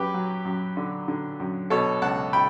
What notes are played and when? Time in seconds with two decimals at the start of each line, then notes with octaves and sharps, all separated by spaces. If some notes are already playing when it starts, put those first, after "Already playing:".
Already playing: F#2 G4 B4
0.14 F#3
0.45 F#2
0.77 D3
1.08 D3
1.40 F#2
1.70 B2 A4 C#5
2.02 C#2 F#5 A5
2.33 G5 B5